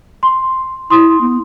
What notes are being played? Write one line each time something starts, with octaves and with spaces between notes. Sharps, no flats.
C6
E4 C6 D#6
B3